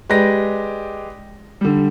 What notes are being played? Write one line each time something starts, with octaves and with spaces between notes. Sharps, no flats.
G#3 G4 B4 D5 A#6
D3 G3